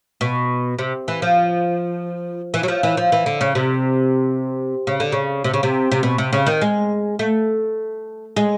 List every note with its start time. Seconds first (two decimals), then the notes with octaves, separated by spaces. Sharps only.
0.21 B2
0.79 C3
1.08 E3
1.22 F3
2.54 E3
2.63 F#3
2.68 F3
2.83 E3
2.97 F3
3.12 E3
3.26 D3
3.41 C#3
3.55 C3
4.87 C#3
5.00 D3
5.12 C#3
5.44 C3
5.54 C#3
5.63 C3
5.92 C3
6.03 B2
6.18 C3
6.33 C#3
6.47 D#3
6.62 G#3
7.19 A3
8.36 G#3